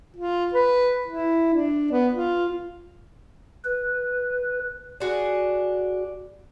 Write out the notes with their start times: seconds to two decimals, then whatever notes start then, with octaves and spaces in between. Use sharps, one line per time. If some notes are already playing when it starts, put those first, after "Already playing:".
0.16 F4
0.53 B4
1.07 E4
1.54 D4
1.91 B3
2.14 F4
3.64 B4
5.00 D4 F#4 G#4